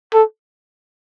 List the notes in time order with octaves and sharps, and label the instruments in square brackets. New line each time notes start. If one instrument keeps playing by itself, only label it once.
[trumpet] A4